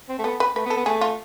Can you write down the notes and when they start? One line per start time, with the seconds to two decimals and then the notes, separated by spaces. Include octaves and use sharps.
0.09 C4
0.19 A3
0.24 B3 A4
0.40 B4
0.56 A3 B4
0.65 B3
0.70 A4
0.77 B3
0.86 A3 G#4
1.01 F4